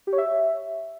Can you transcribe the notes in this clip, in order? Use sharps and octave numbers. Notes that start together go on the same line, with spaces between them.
G4
C#5
E5